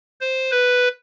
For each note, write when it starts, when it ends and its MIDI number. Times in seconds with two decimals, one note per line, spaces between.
0.21 0.51 72
0.51 0.89 71